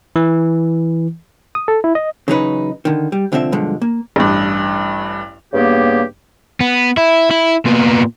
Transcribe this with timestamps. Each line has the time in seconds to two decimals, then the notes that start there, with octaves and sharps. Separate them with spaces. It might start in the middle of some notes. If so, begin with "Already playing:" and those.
0.16 E3
1.55 D#6
1.68 A4
1.84 E4
1.95 D#5
2.28 C#3 E3 F#3 C#4 D#4 B4
2.85 D3 D#3
3.12 G3
3.32 C2 D3 F3 C4 E5
3.52 B1 G2 D3 F3 G#3
3.82 A#3
4.16 A1 G2
5.53 G2 C#3 A#3 B3 G4
6.61 B3
6.97 E4
7.31 E4
7.65 A#2 B3